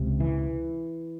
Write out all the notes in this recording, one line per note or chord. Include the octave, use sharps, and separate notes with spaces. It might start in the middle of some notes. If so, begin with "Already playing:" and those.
Already playing: C#2 C3
E3